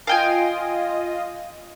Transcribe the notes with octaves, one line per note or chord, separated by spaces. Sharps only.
F4 D#5 F5 G5 G#5 D#6